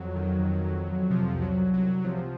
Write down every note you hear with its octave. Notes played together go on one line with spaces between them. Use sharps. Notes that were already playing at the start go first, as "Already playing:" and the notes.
Already playing: F2 F#3
D#3
F2
F2
F2
C3 F3
C2
F#3
C2
F#3
C2
C3 F3